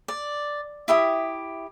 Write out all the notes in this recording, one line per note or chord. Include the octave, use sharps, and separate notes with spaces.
D5
E4 G4 E5 D#6